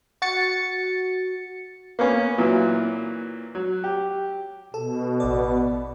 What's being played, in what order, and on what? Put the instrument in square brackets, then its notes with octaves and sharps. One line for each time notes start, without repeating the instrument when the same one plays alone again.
[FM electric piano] F#4 A6 C#7
[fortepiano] A#3 B3 C#4
A#2 E3 F#3
F#3
G4
[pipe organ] B2 [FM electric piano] A4
[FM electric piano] A1 D5 [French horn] B3